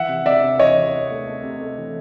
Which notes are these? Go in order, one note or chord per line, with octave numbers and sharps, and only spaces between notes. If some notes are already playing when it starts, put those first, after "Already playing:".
Already playing: E3 E5 F#5
C3
C3 D5 E5
C3
E3 C#5 D#5
C3
C3
A3
A3
C3
A3
E3